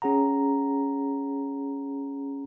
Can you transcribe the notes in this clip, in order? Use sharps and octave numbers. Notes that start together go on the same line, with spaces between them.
C#4 G#4 F#5 A#5